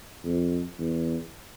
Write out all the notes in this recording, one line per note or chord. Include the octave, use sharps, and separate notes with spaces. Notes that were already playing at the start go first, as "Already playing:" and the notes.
F2
E2